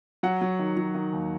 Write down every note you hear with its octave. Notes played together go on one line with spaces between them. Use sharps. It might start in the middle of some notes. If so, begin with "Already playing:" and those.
F#3 F#5
F#3
D#3
F#3
D#3
D#2